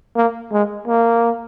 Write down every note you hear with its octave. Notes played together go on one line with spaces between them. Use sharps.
A#3
G#3
A#3